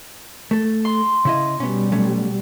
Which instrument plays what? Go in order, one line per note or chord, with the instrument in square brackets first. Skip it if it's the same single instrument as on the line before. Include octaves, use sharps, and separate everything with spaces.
[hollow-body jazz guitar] A3 A4
[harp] C6
[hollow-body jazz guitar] C#3 E4 D#5
[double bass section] B2 G3 [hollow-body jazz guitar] B3 C#4
[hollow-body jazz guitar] F#3 A3 C#4